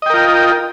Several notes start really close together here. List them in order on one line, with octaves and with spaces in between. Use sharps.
D#5 G5 A#4 F4